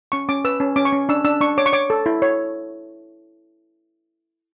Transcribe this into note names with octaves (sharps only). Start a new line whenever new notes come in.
C#4 C#6
C#4 D6
B4 E6
C#4
C#4 D6
C#6
C#4
D4 E6
D4 E6
D4 C#6
C#5 D6
C#6
C#5 D6
A4
E4
C#5